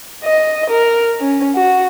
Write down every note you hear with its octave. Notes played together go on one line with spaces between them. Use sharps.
D#5
A#4
C#4
F#4